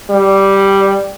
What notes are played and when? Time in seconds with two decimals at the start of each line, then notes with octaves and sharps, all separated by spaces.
0.10 G3